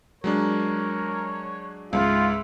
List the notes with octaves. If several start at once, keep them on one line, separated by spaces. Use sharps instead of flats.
F#3 G#3 D4 A#4 C#5
C#2 G#2 F4 E5